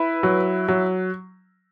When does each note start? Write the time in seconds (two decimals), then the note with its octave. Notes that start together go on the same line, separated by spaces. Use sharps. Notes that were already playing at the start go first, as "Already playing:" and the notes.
Already playing: E4 B4
0.23 F#3
0.68 F#3